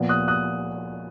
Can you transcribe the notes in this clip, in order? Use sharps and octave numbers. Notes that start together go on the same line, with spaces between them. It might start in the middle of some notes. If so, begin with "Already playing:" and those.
Already playing: A#2 F3 B3
D#6 F#6
D#6 F#6